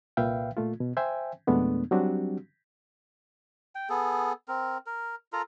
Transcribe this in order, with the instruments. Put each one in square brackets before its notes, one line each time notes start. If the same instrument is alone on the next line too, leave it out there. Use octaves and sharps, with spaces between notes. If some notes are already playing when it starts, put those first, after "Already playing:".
[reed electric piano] C2 A#2 B4 E5 F5 G5
A#2 A3 F4
B2
C5 E5 G5 G#5
F2 B2 G#3 A3 B3 D4
F#3 G3 C4 D4 F#4 G4
[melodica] G5
B3 G#4 A4
C4 A#4
A#4
F4 A4 A#4 A#5